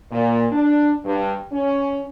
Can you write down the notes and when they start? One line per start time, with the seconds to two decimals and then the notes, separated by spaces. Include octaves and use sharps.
0.11 A#2
0.52 D4
1.05 G2
1.52 C#4